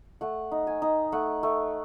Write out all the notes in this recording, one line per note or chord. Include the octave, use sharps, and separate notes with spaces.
A3 F#5
D#4
G#5
D#4
A3 F#5
A3